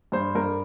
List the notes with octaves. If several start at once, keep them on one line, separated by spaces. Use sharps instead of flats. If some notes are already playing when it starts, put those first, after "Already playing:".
G2 C5
G2 A#4